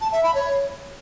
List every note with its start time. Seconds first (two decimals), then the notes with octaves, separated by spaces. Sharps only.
0.01 A5
0.12 E5
0.23 B5
0.35 C#5